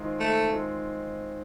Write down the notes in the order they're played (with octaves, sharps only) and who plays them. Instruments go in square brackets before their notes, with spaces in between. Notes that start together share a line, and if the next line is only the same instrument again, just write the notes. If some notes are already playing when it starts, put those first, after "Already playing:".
Already playing: [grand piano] D#3 G#3 C4 F4
[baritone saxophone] A3
[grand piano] D#3 G#3 C4 F4